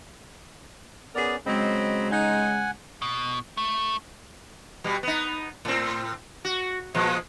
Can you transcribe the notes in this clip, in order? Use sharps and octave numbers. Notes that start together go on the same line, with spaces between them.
B3 C#4 G#4 A#4 D5
C#3 F#3 G#3 C4 D#5 B5
D#4 F#5 G#5
B2
A3
B2 G3
B3 D#4
A2 C4
F#4
A#2 F3 G#3